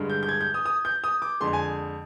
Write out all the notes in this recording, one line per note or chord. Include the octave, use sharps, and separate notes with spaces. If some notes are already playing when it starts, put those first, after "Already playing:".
Already playing: G2 D3 G#3
G6
G6
G#6
G6
D#6
D#6
G6
D#6
D6
F2 D3 G#3 C6
G#5